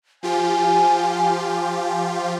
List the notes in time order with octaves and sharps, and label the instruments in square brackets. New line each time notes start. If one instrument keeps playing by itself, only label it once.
[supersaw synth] F3 F4 G4 [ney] G#5